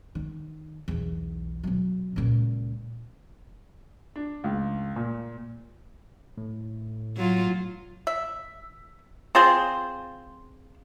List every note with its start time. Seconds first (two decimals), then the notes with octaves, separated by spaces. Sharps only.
0.15 D#3
0.88 B1 E2
1.63 B2 F#3
2.16 C#2 A#2
4.16 D4
4.44 C#2
4.96 A#2
6.37 A2
7.17 F#3 F4
8.07 E5
9.35 C4 F4 G#4 C5